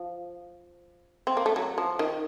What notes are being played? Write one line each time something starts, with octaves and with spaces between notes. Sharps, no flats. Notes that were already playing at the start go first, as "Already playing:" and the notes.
Already playing: F3
C4
A#3
A3
F#3
F3
D#3